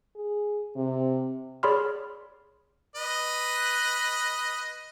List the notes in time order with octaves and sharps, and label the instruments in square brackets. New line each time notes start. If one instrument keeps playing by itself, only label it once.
[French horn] G#4
C3
[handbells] G#4 C#5 D5 B5 C6 F6
[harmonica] B4 D#5